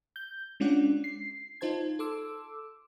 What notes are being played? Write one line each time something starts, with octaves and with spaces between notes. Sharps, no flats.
G6
G#3 C#4 D4 F4 D5 F#5
C7
D#4 F4 C5 A5 G#6
A4 C6 D6 E6